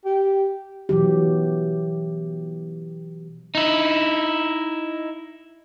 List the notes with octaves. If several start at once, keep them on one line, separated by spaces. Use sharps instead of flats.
G4
B2 E3 F#3 G4
D#4 E4